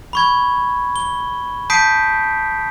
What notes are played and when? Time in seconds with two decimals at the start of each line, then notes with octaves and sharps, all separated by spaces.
0.13 B5 C#6 G#6
0.96 G7
1.70 A5 D#6 G6 B6 C7 D7